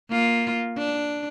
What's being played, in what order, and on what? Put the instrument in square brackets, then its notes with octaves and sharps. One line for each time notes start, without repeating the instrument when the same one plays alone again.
[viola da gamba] A#3 F4
D4